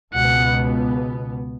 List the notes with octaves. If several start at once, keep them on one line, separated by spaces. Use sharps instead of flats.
C#2 B2 B3 F#5